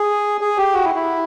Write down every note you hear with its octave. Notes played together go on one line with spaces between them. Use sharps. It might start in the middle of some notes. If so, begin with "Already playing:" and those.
Already playing: G#4
G#4
G4
F#4
E4
E4